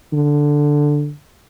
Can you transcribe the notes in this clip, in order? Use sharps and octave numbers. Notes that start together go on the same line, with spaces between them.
D3